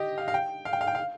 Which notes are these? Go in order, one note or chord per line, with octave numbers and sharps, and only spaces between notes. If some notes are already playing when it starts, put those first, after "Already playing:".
Already playing: G4 D#5
F5
F5
G5
F5
G5
F5
G5
F5